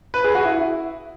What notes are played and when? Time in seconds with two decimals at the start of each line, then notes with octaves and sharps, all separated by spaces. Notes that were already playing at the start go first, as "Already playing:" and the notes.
0.14 B4
0.24 G#4
0.35 F#4
0.45 E4